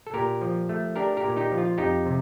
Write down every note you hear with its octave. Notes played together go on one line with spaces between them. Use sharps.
A4
A#2 G4 A#4
F3
A3
D4 G4 A#4
G4 A#4
A#2
D#4 G4
F3
F4
F2 D#4 G4
C3